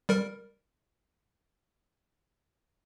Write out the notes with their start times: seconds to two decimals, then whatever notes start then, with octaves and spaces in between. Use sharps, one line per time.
0.09 G3 A#4